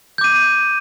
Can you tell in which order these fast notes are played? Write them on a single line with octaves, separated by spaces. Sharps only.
G6 D6 D#7